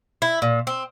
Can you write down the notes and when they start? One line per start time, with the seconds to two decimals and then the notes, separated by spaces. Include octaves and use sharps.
0.22 E4
0.42 A#2
0.67 C4